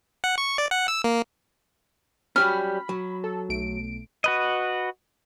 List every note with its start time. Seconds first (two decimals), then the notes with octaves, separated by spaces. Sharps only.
0.24 F#5
0.38 C#6
0.58 D5
0.71 F#5
0.88 E6
1.04 A#3
2.36 F#3 G3 C#4 B5 F6
2.89 F#3
3.24 A4
3.49 B1 A3 D7
4.24 F#4 B4 D#5